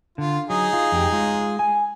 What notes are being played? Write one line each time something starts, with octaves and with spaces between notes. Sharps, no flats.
D3 F4
F#3 D#4 G#4
F4
F2 G4
G#3 F4
G#5